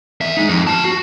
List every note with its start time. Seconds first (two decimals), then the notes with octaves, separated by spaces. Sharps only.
0.21 E2 E5
0.37 G#3 D#4
0.49 F2
0.67 F#4 A5
0.85 F#4